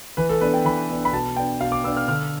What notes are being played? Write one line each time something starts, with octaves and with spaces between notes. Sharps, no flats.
E3 B4
A4
B3 D4 B4
G5
E3 B5
B3 D4
B5
B2 A5
B3 D4 G5
B2 F5
D6
B3 D4 E6
F6
D3 F6